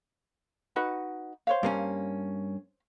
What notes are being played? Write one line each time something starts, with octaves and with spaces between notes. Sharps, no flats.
D#4 F#4 B4
C5 C#5 F5
G2 A#3 C#4